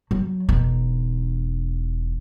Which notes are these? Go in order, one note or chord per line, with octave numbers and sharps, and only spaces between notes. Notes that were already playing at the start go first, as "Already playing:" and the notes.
F#3
E1 D#4